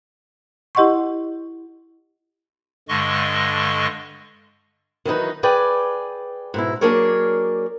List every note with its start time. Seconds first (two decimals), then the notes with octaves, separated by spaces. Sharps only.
0.75 E4 G4 D#5 F#5 C6 C#6
2.89 G2 D3 G#3 D#5 C#6
5.05 D#3 E3 F#3 D#4 B4
5.43 G#4 B4 D5 G5 G#5
6.54 G#2 B2 E4
6.81 F#3 A#3 D4 G#4 A#4 C#5